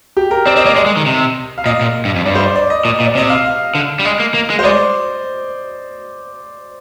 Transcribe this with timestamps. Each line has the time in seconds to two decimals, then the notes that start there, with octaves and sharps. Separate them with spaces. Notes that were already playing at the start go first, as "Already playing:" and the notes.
0.17 G4
0.31 A#4
0.46 C4 D5
0.56 C4 D#5
0.66 A#3 D5
0.76 G#3 D#5
0.86 G#3
0.97 D#3
1.06 C3
1.58 F5
1.66 A#2 D#5
1.81 A#2
2.05 G2
2.16 F2
2.26 G2 D5
2.35 C5
2.45 D5
2.55 D5
2.70 D#5
2.85 A#2 D#5
3.00 A#2
3.06 D5
3.15 C3 D#5
3.30 F5
3.45 F5
3.75 D3
4.00 G3
4.05 G#3 D#5
4.20 A#3
4.34 A#3
4.50 G#3
4.59 C5
4.64 G#3 D5